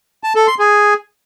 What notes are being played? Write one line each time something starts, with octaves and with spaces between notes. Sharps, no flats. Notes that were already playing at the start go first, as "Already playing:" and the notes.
A5
A4
C6
G#4